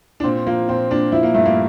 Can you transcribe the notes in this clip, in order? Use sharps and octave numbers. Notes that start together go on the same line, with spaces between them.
D4
A#2 C4
F3 A#3
A#2 C4
A#2 D4
F3 E4
A#3
G2 A3
A#3